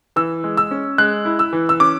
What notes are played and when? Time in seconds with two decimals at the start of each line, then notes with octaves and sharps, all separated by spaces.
0.16 E3 E6
0.44 G#3
0.57 E6
0.71 C#4
0.98 G#3 F#6
1.25 E4
1.39 E6
1.53 E3
1.69 E6
1.80 C#4 D6